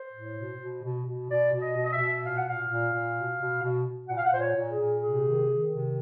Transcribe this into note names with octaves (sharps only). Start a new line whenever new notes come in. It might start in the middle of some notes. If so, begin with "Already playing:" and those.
Already playing: C5
A2
B2
B2
B2
B2
B2 D5
B2
D#5
B2
D#5
E5
B2
A#2 F5
F#5
A#2 F5
A#2
A#2
B2
B2
B2
B2
A#2 F#5
F5
F#5
A#2 C5
C#5
A#2
G#4
A#2
C3 G#4
D#3
D#3
C3